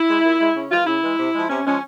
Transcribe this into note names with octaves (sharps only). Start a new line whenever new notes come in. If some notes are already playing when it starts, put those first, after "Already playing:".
Already playing: E4
G#3
A#2
G#3
C#3 C#4
E3 G#3 F4
C#3 E4
E3 G#3
C3
F3 G#3
C3 C#4
F3 G#3 C#4